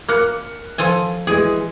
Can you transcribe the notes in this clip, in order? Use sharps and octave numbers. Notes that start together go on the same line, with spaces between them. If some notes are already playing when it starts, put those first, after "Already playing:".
A#3 F6 F#6 C#7
F3 A4 G#5
E3 G#3 G#4